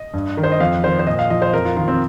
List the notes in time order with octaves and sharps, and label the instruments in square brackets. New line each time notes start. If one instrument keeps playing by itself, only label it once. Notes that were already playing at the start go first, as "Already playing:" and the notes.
Already playing: [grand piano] D#5
G2
D#3
C5
D#5
F2 F5
D#3 C5
C5
A#2 D#5
F5
F3 D#5
C5
F2 A#4
F4
D#3 F4
C4